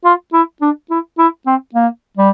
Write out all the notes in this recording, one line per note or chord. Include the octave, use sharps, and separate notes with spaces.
F4
E4
D4
E4
E4
C4
A#3
G3